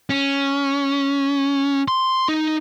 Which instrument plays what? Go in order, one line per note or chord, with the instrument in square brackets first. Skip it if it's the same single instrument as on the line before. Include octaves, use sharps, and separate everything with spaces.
[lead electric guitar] C#4
C6
D#4